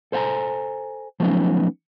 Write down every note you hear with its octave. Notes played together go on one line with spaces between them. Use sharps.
A4 C5 E5 F#5 G#5 A#5
F3 F#3 A3 B3 C#4 D#4